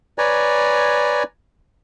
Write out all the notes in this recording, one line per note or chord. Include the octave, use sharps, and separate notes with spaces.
B4 C#5 D5 G#5 A#5